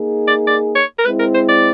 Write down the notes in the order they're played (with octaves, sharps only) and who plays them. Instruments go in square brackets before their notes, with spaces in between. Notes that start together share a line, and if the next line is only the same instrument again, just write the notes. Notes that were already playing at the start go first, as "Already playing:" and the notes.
Already playing: [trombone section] A#3 D#4 G#4
[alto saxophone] D5
D5
C#5
A#4
[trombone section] G#3 C4 E4 [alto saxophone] B4
[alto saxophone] A#4
C5
D5